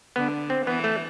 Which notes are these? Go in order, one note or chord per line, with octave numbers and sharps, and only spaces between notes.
D3 B3
C4
E3 B3
A3